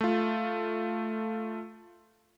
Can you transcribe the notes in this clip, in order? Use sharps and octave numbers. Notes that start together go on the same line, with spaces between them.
A3 F4